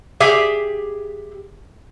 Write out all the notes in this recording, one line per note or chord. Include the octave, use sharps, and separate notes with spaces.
G4 G#4 E5